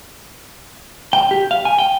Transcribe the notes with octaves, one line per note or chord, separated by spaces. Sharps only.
G5
G4
F5
G#5
G5